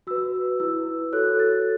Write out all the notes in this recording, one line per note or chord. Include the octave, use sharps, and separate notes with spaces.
F#4 B4 E6
E4 B4 E6
F#4 A4 C#5 F#6
A6